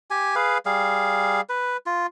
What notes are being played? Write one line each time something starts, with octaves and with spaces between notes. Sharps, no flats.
G4 G#5
G#4 B4 F5
G3 G#4 F5
B4
F4